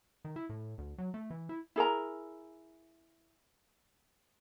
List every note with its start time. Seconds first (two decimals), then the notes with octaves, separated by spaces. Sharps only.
0.25 D#3
0.36 E4
0.50 A2
0.78 D2
0.98 F#3
1.14 A3
1.30 E3
1.49 E4
1.76 E4 G#4 A#4 A#5